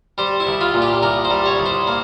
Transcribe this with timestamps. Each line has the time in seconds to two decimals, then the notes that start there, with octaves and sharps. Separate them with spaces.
0.18 G3 C5
0.40 E4
0.47 C2
0.61 F4
0.74 A#2
0.82 G4
1.03 C2 A#4
1.25 C5
1.31 G3
1.46 C#5
1.60 C2
1.66 C5
1.87 A#3